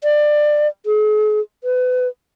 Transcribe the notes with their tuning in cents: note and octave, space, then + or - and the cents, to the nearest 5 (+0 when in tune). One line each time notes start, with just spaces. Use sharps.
D5 +20
G#4 +45
B4 +30